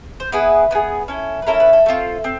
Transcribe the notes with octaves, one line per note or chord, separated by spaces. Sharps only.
C5
B3 E4 G#4 B4
B3 E4 G#4
C#4 E4 A4
B4
C#4 E4 A4 A#4
B4
A4
A3 C4 F4
C4